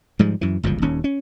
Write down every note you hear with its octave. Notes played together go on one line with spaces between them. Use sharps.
G#2 F3 G3 G#3
F#2 E3
G1 C#2 F#2 F3
D#1 D#2 C#4
C#4